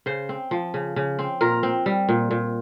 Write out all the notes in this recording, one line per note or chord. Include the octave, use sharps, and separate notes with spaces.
C#3 C5
C4
F3
C#3
C#3
C4
A#2 A#4
C4
G3
A#2
A#2